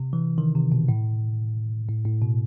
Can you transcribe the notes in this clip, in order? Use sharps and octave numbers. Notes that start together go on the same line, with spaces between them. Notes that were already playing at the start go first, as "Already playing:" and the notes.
Already playing: C3
E3
D#3
C3
B2
A2
A2
A2
B2